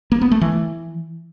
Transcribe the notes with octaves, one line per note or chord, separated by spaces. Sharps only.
A#3
B3
A3
E3